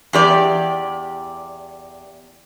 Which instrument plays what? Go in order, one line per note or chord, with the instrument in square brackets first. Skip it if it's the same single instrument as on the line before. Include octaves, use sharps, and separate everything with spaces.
[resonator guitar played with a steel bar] E2 G4 D5